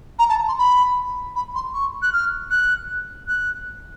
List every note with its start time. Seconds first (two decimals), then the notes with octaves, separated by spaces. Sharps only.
0.19 A#5
0.29 A5
0.48 C6
0.58 B5
1.35 B5
1.55 C6
1.74 C#6
2.02 F#6
2.13 F6
2.50 F#6
3.28 F#6